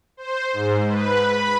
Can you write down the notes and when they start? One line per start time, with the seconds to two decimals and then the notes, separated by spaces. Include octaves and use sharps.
0.17 C5
0.53 G#2
0.89 B4
1.24 B5